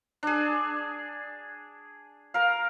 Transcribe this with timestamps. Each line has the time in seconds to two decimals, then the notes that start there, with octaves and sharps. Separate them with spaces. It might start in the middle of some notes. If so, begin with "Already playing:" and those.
0.23 D4 G#4
2.34 A#4 F5